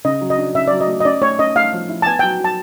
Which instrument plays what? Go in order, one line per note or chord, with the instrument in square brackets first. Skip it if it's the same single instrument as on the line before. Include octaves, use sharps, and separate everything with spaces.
[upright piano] C#3 [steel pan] D#5
[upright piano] F#3
[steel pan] D#5
[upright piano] D4
[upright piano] C#3 [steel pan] E5
[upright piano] F#3 [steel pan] D5
[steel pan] D#5
[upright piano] A3
[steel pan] D#5
[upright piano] C#4 [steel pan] D5
[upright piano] A3 [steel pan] C#5
[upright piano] C#4 [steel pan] D#5
[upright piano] A3 [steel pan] F5
[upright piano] F3
E4
[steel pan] A5
[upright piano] B3 [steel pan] G#5
[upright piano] F#3 [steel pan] G5
[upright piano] F#3 [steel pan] A5